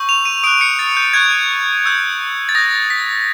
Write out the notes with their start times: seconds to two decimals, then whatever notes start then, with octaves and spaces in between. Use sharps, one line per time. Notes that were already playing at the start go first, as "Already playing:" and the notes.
Already playing: C#6 E6 G6
0.09 F7
0.25 D#7
0.43 D#6 F#6 D7
0.61 C#7
0.79 A6
0.97 G6
1.14 C#6 F#6 G#6
1.84 C#6 E6 G6
2.49 A6
2.55 D#6 G6 A#6
2.90 B6